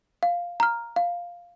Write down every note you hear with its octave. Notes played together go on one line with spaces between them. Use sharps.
F5
A#5 F6
F5